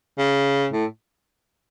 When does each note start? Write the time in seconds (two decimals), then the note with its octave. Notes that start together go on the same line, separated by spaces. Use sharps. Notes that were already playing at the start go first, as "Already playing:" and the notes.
0.18 C#3
0.72 A2